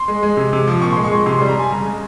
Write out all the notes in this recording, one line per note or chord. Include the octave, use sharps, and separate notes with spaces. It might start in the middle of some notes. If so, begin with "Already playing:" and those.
Already playing: C6
G#3
G#3
C3
C3
F3
A#2 C#6
C6
G#3
C#6
G#3 C6
C3 C6
C6
G3
A#5
G3 G#5
C#3 A#5
G#3